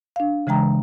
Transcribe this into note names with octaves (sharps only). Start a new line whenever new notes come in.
D4 F5
C#3 E3 G#3 G5 A#5